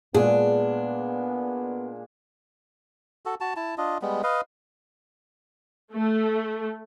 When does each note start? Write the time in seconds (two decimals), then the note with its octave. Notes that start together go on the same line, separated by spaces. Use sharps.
0.14 A#2 G#3 B3 D4 G#4
3.26 F#4 A4
3.41 F#4 A5
3.56 E4 A5
3.78 D4 F4 D#5
4.02 G3 G#3 B3
4.23 B4 D#5 F5
5.94 A3